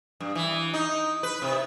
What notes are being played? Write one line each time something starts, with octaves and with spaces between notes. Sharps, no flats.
G2
E3
D#4
B4
C3